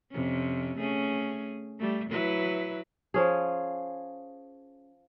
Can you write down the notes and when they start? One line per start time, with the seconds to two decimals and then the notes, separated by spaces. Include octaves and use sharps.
0.11 F2 C3 C#4
0.78 A3 C#4 G#4
1.79 G3 A3
2.10 F#3 E4 B4
3.14 F3 C#4 G#4